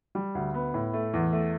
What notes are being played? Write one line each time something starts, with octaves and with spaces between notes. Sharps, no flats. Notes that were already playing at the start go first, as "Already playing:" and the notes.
G3
D2
B3
A2
A3
E2
A3